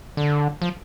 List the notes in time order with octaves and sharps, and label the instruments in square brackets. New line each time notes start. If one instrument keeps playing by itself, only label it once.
[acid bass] D3
F3